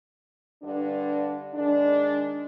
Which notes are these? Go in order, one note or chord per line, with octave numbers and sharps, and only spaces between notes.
G2 D3 D4
D#3 G#3 D4